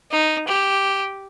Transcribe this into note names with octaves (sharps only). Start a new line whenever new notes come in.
D#4
G4